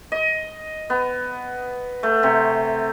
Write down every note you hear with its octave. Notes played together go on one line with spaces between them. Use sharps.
D#5
B3
A3
C3